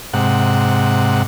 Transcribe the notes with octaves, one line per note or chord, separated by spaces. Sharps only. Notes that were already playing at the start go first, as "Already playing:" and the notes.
G#2 C3 F#5